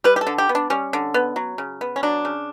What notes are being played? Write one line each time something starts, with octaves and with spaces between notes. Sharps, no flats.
G3 B4
G4
A4
D3
G4
B3
D4
G3 C#4
D3
B3
F#3
C#3
B3
C#4
F#3 D4
C#3